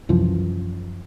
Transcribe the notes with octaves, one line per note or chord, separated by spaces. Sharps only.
C2 F#2 E3 F3